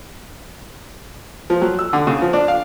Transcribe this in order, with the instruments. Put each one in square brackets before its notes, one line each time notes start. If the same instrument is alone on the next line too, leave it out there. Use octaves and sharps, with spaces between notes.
[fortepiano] F3
F#3
E6
D3
C#3
F3
D4
F5